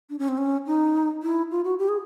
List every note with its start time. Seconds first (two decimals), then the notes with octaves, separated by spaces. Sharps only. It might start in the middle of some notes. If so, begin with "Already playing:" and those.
0.10 D4
0.19 C#4
0.28 C4
0.37 C#4
0.66 D#4
1.23 E4
1.51 F4
1.64 F#4
1.79 G4
1.89 G#4